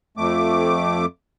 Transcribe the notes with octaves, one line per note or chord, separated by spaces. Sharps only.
F2 A3 D6